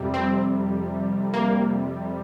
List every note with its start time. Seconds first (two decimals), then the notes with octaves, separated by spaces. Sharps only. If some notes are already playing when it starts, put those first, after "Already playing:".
Already playing: F2 C3 G3
0.14 C4
1.34 A#3